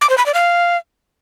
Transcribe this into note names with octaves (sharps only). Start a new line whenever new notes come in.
D6
C5
B5
D5
F5